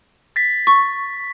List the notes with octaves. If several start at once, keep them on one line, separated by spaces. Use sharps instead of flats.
A6 B6
C#6